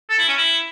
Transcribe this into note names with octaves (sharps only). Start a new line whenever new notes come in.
A4
E4
C#4
E4